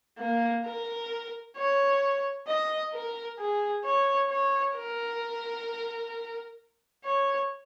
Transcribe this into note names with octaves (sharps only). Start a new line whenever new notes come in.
A#3
A#4
C#5
D#5
A#4
G#4
C#5
C#5
A#4
C#5